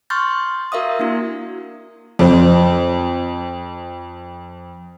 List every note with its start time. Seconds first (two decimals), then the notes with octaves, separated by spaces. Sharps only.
0.10 C6 C#6 F6 G6 A6
0.72 F#4 A#4 E5 F5 D#6
0.99 A#3 D4 E4 F#4
2.19 F2 C5